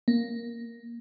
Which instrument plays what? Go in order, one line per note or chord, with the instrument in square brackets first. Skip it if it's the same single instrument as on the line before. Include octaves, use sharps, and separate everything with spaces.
[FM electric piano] A#3